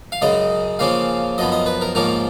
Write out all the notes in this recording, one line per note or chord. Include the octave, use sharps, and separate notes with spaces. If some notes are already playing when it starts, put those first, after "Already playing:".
F5
F#2 C#3 G#3 D#5
C#3 F3 A#3 C#4 F5
F#2 F3 B3 D#5
D#5
B4
A#4
G#2 F3 A#3 C#4 A#4